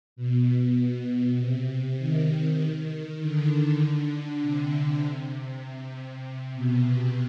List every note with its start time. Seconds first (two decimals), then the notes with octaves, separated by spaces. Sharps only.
0.16 B2
0.76 B2
1.37 C3
1.98 D#3
3.20 D3
4.42 C3
6.23 C3
6.54 B2
6.84 C3